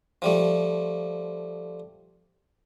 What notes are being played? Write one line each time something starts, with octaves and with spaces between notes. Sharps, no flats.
F3 G3 A3